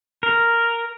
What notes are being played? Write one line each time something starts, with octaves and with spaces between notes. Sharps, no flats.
A#4